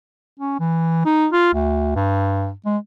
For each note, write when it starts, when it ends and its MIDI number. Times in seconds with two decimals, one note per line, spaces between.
0.40 0.55 61
0.60 1.05 52
1.05 1.27 63
1.32 1.52 65
1.54 1.95 38
1.95 2.51 43
2.66 2.77 56